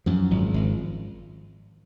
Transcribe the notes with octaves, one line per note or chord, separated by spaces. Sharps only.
F#2 F3
G#1
G#1